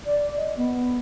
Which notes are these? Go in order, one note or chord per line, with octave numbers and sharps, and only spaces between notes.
D5
D#5
B3